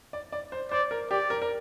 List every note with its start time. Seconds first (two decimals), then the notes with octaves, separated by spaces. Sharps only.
0.13 D5
0.32 D5
0.52 C5
0.71 C5 D5
0.91 A#4
1.11 G4 D5
1.30 A#4
1.42 A#4